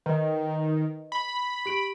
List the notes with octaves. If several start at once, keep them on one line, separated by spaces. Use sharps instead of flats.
D#3 B4 D#5
B5
G4 D7